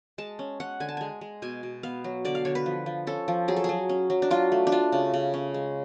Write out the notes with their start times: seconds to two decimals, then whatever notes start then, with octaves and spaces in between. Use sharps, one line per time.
0.18 G#3 A5
0.39 C#4
0.60 C#4 F#5
0.80 D3 G#5
0.89 A5
0.97 G#3 G#5
1.21 G#3
1.42 B2 G#5
1.63 B2
1.83 B3 F5
2.04 F#3
2.25 D3 D5
2.35 F5
2.45 D3 C#5
2.55 B4
2.66 F3
2.86 F3
3.07 C#4 A4
3.28 F3
3.48 F#3 G#4
3.57 A4
3.64 F#3 G#4
3.89 C#4
4.10 F#3
4.22 D4
4.31 F#3 F4
4.52 A3
4.67 D4
4.72 A3 F4
4.92 C#3
5.14 C#3
5.34 C#4
5.54 G#3